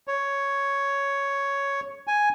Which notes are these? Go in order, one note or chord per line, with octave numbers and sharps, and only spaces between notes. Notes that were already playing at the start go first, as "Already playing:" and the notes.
C#5
G#5